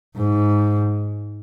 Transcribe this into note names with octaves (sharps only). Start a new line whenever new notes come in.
G#2